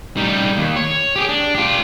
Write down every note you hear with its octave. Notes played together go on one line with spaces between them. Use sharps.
G3 D#4
D#2
C#5
G4 G#4
D4
F4 G4